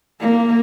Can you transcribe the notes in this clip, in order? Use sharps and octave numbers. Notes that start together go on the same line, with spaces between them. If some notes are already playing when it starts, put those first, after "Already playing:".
A#3